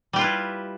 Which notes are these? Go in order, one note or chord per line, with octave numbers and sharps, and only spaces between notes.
G3 E4 F4 G4 B4